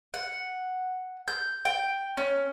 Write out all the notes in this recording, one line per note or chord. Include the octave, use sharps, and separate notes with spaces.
F#5
G6
G5
C#4